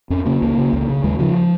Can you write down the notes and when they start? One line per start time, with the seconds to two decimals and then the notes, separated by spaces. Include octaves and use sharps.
0.10 F2 C#4
0.25 C#3 A#3
0.42 C#2 A#3
0.58 C#3
0.73 C#2
0.89 C#3
1.04 D#2 G#3
1.19 C#3 F3